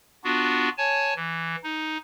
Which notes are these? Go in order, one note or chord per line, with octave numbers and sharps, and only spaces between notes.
B3 D4 F4 F#4
C#5 G#5 A5
E3
D#4